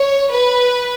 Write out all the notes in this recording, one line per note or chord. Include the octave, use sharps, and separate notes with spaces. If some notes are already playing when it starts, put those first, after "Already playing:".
Already playing: C#5
B4